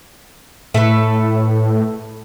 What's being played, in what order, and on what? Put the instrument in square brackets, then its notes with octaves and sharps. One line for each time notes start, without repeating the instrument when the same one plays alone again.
[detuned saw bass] A2 [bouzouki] A3 A4 B4